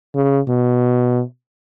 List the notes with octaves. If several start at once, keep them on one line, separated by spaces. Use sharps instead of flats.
C#3
B2